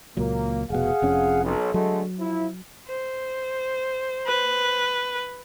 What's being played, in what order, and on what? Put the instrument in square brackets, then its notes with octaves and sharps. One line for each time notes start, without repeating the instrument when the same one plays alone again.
[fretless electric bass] C#2 A#2 F#3 [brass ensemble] A#3
[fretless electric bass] F1 B2 [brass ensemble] G#4 F5 F#5
[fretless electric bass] F1 F2 C#4
[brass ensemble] B1
[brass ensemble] D3 G#3 A3 [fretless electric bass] F#3
[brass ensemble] F3 E4
[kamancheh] C5
[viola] B4